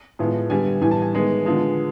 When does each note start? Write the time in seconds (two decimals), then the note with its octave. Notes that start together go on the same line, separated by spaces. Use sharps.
0.19 A2 F3 G#3 B3
0.50 D3 G3 B3 G#5
0.81 A2 E3 G3 B3 G#5
0.91 A5
1.02 G#5
1.13 D#3 G#3 B3
1.45 D3 F3 G#3 B3